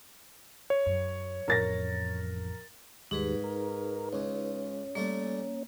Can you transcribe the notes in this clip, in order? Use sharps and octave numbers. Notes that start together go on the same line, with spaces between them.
C#5
F#2
A1 F2 A#4 A6 A#6
D#2 G#2 G3 D#4 G#4 B4
A#4
C#2 C#4
G3 A3 A#3